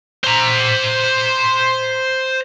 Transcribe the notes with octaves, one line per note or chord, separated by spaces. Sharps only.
C5 A#5